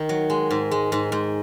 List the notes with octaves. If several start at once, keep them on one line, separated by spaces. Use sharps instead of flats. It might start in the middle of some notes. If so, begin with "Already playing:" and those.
Already playing: D#3 D#4
F#3
G#3
G#2
G#3
G#2
G#2